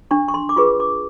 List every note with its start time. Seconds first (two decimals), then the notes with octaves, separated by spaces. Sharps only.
0.11 D4 C#6
0.28 C#6
0.34 C6
0.49 D6
0.56 F4 G#4 B4 C#6
0.80 D6